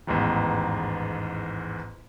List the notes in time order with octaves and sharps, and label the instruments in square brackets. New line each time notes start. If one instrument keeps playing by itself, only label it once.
[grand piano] A1 E2 G#2 D#3